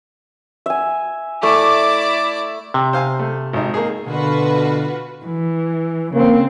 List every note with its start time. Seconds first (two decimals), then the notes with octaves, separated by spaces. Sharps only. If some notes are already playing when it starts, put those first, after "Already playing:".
0.66 E5 G#5
1.43 A3 E4 D5 D6
2.74 C3
2.93 C5 F5 G#5
3.19 A3
3.53 G#1 D#4
3.74 A#3 G#4
4.07 B2 D3 F4 F#4 B4
5.25 E3
6.14 C#3 A#3 C4